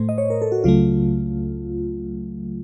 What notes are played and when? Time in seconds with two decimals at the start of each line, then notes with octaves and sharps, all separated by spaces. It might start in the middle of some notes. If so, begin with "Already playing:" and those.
Already playing: A2 A3 C5
0.09 D#5
0.18 C#5
0.30 A#4
0.42 A4
0.52 F#4
0.64 C#2 C#3 F#3 A3 F4